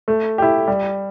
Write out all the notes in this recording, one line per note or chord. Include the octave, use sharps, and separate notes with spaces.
A3
E4 G4
G3